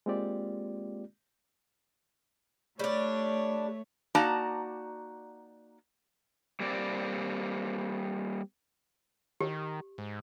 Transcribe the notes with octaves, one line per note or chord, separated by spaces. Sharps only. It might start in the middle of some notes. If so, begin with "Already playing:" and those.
G#3 A#3 C4 F4 G4 D5
G3 A3 D4 C#5
A#3 D#4 F#4 D5 A5 A#5
G3 A#3 C4 D5
D#3 G4
G#2